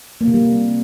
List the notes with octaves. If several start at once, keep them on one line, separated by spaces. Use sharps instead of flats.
A#3
C3
G3